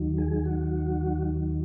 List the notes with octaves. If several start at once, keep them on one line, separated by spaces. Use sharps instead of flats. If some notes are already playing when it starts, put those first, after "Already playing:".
Already playing: D#2 D#3 F#3
G#4
F#4